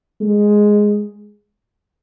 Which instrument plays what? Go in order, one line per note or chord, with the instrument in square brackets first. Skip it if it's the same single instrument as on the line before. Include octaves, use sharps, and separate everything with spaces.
[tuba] G#3